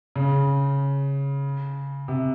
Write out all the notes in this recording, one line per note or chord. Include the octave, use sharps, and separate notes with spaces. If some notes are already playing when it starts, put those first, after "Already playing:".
C#3
C3